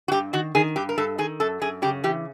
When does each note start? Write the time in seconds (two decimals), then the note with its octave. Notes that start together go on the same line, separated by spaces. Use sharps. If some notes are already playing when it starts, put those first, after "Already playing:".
0.08 F#4
0.12 G2 G4
0.33 D#3 F#4
0.55 D#3 G#4
0.76 G2 G4
0.89 A#4
0.98 G2 A4
1.18 D#3 G#4
1.40 F#2 A4
1.61 F#2 G#4
1.82 C#3 G4
2.04 E3 G4